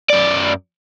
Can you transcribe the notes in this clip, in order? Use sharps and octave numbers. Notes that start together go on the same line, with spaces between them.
F#2 D5